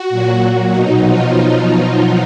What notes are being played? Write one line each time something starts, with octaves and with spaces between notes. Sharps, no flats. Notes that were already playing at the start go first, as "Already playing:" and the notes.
Already playing: F#4
A#2 F#3
B2 F#3 D#4
F3 F4